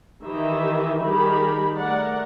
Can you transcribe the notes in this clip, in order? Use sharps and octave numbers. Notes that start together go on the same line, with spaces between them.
D#3 E3 G4 D#5 E5
D#3 G3 G4 G#4 A#4 B5
A3 A#4 D5 F#5